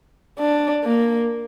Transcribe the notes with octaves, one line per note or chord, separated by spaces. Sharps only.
D4
A#3